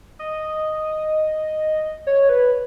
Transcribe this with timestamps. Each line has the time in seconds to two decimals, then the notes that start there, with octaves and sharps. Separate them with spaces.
0.19 D#5
2.07 C#5
2.29 B4